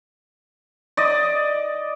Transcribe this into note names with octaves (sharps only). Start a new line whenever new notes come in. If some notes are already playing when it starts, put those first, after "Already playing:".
D5 D#5